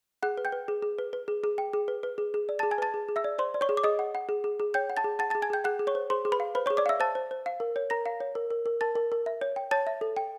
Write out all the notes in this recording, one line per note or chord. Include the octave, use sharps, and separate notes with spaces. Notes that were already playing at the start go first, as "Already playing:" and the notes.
G#4 F#5 F#6
B4
G5 G6
B4
G#4
G#4
B4
B4
G#4
G#4
G5
G#4
B4
B4
G#4
G#4
D5
G#4 A5 A6
G#5 G#6
B4 A5 A6
G#4
G#4
E5 E6
D5
C5 D5 C6
D5
C#5 C#6
G#4
D6
G#4 D#5 D#6
F#5
F#5
G#4
G#4
G#4
C#5 G5 G6
F#5
A5 A6
G#4
F#5 A5 A6
G#4 A5 A6
G#5 G#6
G#4 G5 G6
G#4 F#5 F#6
G#4
C#5 C#6
C5
G#4 C5 C6
G#4
B4 B5
F5
B4 C5 B5
G#4 C#5 C#6
D5 D6
E5 F5 E6
C5 A5 A6
C5
C5
F5
A#4
C#5
A#4 A#5 A#6
F5
C#5
A#4
A#4
A#4
A#4 A5 A6
A#4
A#4
E5
C#5
G5
C#5 A5 A6
E5
A4
G5